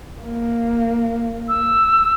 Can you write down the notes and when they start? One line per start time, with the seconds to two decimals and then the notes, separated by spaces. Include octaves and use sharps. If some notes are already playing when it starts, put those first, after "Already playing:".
0.22 A#3
1.48 E6